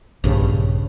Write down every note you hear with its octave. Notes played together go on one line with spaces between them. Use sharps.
A#1 G2 C#3